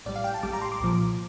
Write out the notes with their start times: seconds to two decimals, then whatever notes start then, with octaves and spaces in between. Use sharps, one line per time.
0.06 A1 A2 G3 D5
0.16 F5
0.24 G5
0.34 A5
0.43 A1 A2 G3 D6
0.53 A#5
0.62 C6
0.72 D6
0.80 C2 A#2 F3